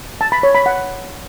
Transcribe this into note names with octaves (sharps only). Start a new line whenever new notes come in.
A5
B5
C#5
B5
F#5